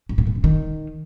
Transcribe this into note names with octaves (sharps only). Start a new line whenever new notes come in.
G#2
A2
A#2
C#3
D#3